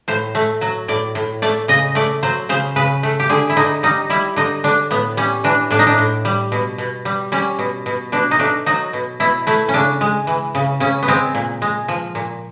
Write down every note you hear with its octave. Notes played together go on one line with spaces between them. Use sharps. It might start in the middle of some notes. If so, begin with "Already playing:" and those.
A2 C5
A3
F#3
A2 D5
A2
A3 D5
C#3 D#5
A3 D5
F#3 C5
C#3 C5
C#3 B4
A3
G4
D3 G#4
E4
D3 D#4
G3 D#4
G3 E4
D3 D#4
D3 D4
A2 B3
G3 C#4
E3 D4
A2 D4
D#4
D4
A2
G3
B2
B2
G3
G3 C#4
B2
B2
B2 D4
D#4
A3 D4
F#3 D#4
B2
B2 E4
A3 E4
C#4
C#3 D4
G#3
E3
C#3
C#3 C#4
B3
G#3 C4
A#2
G#3
F3
A#2